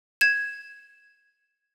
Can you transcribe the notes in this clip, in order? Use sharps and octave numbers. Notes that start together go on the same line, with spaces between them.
G#6 E7